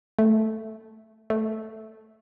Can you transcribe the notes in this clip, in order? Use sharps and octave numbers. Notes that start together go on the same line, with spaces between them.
A3
A3